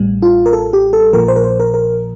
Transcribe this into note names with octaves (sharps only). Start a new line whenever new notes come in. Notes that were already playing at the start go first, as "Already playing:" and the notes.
Already playing: A1 A2 G3
F4
A#4
A4
G4
A4
A#1 A#2 F3 A#4
C5
A#4
C5
A#4
A#4